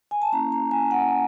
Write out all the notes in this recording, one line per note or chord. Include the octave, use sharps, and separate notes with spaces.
G#5
A5
A#3 C#4 E4 A#5
A#5
G#5
F#5